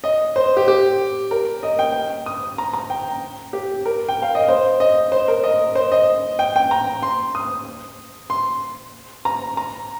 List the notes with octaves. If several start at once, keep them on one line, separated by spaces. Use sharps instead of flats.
D#5
C5
G4
G4
A#4
D#5
G5
D#6
A#5
A#5
G5
G4
A#4
G5
F5
D#5
C5
D#5
C5
A#4
D#5
C5
D#5
G5
G5
A#5
C6
D#6
C6
A#5
A#5